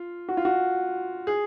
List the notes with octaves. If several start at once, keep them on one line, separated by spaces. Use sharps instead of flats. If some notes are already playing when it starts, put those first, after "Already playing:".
Already playing: F4
F#4
F4
F#4
G#4